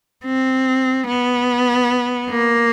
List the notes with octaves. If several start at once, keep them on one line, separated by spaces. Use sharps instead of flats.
C4
B3
A#3